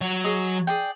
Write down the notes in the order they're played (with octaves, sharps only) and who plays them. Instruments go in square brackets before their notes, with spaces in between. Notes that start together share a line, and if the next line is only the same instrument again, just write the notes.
[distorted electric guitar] F#3
[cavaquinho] G#4 D#5
G#4 D5 G5